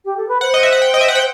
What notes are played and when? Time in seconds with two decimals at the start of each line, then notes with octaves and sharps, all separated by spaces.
0.05 G4
0.17 A4
0.28 B4
0.41 C5 F#5
0.54 D#5
0.63 E5
0.72 F#5
0.82 G5
0.94 D#5
1.01 E5
1.08 F#5
1.15 G5